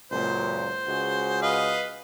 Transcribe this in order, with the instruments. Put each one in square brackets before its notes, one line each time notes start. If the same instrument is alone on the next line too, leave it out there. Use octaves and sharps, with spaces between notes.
[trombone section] C#2 F#2 A#2 [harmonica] C5
[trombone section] C#2 F#4 G#4
[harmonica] B4 D#5 F5